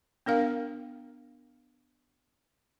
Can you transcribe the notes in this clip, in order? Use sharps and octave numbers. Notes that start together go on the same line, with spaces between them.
B3 D4 A#4 F5